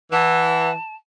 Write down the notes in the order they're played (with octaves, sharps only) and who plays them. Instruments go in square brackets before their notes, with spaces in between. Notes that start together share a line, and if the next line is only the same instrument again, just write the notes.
[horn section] E3 [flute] F#5 [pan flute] A5